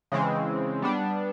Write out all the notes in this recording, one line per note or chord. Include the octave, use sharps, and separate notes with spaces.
C#3 E3 G#3 C4
G3 B3 D4